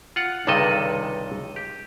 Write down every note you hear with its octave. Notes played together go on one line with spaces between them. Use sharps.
F4 F#5
C#2 G2 C3 D#3 A4 D#5
G4